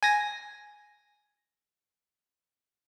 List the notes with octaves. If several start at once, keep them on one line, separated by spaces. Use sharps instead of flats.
G#5 A#6